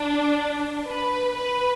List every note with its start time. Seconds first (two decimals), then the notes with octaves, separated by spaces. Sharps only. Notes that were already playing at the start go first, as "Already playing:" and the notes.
Already playing: D4
0.86 B4
1.36 B4